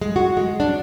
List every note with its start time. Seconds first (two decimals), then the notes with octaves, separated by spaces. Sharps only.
0.01 G#3
0.16 F#4
0.37 G#3
0.60 D4